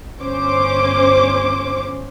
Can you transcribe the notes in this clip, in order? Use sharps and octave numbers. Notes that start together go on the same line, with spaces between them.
G1 C#4 C5 D6